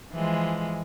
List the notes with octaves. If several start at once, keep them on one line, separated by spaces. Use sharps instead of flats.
E3 F3 G#3